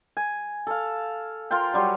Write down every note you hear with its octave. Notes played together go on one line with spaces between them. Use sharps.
G#5
A4 F5
F4 A#4 C5 G5
F#3 G3 C6